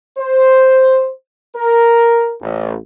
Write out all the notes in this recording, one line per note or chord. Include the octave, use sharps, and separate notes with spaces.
C5
A#4
A1